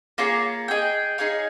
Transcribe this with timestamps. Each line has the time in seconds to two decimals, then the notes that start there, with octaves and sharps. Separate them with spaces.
0.18 A#3 F4 G#4 C#5
0.68 G#4 D#5 G5
1.18 D#4 G#4 C#5 F5